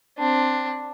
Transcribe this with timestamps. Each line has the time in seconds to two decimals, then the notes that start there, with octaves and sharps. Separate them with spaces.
0.18 C4 D4